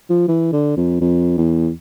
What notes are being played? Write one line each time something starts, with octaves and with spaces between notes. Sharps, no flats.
F3
E3
D3
F2
F2
E2